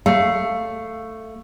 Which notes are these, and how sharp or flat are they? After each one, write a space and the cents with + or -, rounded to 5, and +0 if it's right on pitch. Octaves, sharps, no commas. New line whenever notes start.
A3 +10 F5 +0